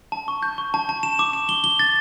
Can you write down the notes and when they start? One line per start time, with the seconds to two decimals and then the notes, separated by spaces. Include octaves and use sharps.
0.12 A5
0.28 C#6
0.43 G6
0.58 C#6
0.74 A5
0.89 A5
1.03 E7
1.19 D6
1.33 E7
1.49 G7
1.64 G7
1.79 A6